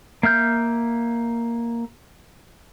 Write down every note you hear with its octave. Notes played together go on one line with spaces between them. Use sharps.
A#3 E5 F6 G6